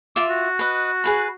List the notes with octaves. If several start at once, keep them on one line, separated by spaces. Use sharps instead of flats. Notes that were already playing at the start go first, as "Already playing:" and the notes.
F4 E5 D6
F#4
B4 D#5
G#4 B4 B5